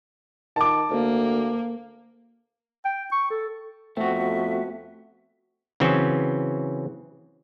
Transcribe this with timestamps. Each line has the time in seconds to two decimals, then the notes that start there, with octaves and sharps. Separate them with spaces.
0.56 D#3 A5 D6
0.91 D2 A#3
2.85 G5
3.12 C#6
3.30 A4
3.97 F2 A3 B3 C4 F#4 E5
5.80 C#3 E3 F#3 C4 C#4